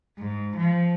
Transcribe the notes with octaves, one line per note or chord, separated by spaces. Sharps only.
G#2
F3